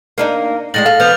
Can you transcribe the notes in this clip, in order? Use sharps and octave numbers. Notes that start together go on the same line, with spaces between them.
A#3 D4 D#4
A2 G#3 D4 A6 A#6 F#7
A4 F5
E3 B3 F6 G6 F7